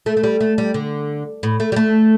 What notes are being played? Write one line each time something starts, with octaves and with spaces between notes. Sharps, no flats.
A3
A3
G3
A3
G3
D3
A2
A3
G3
A3